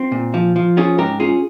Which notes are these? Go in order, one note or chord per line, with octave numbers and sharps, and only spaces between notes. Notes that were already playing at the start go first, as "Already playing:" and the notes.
Already playing: C4 F4
A#2
F3
F3
C#4 F4 G#4
G#2 G4 A#4
C#4 F4 G#4